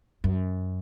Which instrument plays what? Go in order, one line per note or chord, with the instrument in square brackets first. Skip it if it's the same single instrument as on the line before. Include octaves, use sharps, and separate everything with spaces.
[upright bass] F#2